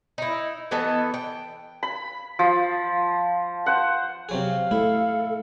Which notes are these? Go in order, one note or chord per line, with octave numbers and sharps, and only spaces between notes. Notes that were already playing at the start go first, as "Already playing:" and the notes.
D#4 E4
E3 B3 A4 D#5
G5
B5
F3
C5 F#5
C3 F#3 G#4 F5
A3 E4 A4